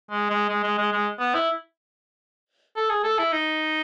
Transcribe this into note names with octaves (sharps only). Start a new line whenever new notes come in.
G#3
G#3
G#3
G#3
G#3
G#3
B3
E4
A4
G#4
A4
E4
D#4